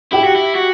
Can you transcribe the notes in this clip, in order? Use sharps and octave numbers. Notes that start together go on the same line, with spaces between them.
E4 G4
F#4
E4
F#4